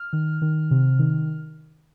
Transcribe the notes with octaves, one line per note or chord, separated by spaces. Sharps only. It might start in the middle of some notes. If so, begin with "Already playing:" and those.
Already playing: F6
D#3
D#3
C3
D#3